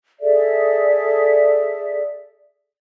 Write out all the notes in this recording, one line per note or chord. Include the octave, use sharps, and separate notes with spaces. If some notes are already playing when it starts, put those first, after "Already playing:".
G#4 A4 D5 E5